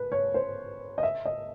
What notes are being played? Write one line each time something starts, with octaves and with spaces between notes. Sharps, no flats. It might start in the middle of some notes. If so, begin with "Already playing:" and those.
Already playing: B4
C#5
C5
D#5
E5
D#5